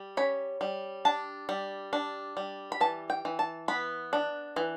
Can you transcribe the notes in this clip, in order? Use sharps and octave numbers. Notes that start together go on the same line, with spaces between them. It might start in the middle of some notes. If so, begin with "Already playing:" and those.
Already playing: G3
C#4 B5
G3
D4 A5
G3
D4
G3
B5
E3 A5
G5
E3
A5
B3 B5
D4
E3